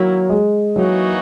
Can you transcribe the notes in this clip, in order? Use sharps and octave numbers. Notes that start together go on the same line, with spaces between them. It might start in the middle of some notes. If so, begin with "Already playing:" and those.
Already playing: D#3 F#3 A#3 E4 A#4 C#5
G#3
E3 F#3 A#3 D#4 F#4 C#5